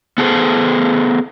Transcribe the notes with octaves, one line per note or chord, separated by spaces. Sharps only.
B3 G#4 A4 C5